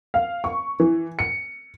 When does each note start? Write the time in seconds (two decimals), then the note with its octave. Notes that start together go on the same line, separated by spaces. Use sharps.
0.14 F5
0.44 C#6
0.80 E3
1.19 C#7